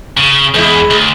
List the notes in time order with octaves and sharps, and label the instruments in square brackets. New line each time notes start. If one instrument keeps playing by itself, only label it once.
[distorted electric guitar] C#3
[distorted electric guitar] E2 [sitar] G#3 E4
[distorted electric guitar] D2